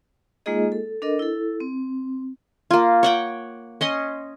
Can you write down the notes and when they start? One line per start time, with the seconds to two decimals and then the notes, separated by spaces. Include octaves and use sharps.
0.46 G#3 A#3 D#4 F4 G#4 D#5
0.72 A4
1.02 D4 A4 A#4 D#5
1.19 E4 A4
1.60 C4
2.71 A#3 F4
3.03 C#5 F#5 G5
3.81 C#4 D#5 C6